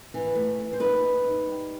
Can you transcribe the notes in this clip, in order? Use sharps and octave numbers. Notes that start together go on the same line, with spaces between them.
E3
A3
E3
C5
D#4 B4
D#4
D#4
G3